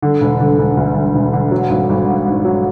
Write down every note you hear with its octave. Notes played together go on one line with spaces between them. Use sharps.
D3
E1
D3
E1
D2
D3
E1
D3
F#3
G#1
G#1
G#2
G#2
F#3